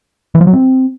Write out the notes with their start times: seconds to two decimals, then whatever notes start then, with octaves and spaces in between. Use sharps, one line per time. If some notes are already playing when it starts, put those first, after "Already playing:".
0.35 E3
0.41 F3
0.47 F#3
0.53 C4